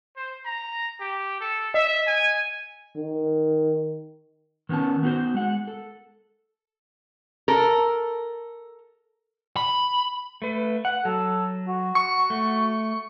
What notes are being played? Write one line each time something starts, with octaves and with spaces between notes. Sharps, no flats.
C5
A#5
G4
A4
D#5 E5
G#5
D#3
D#3 B3 C#4 D#4 A5
B3 D#4 F#4 B4 C5
G#3 F#5
A4
A4 A#4
B5
A3 B4
F#5
F#3 A4
F#4
C#6
A3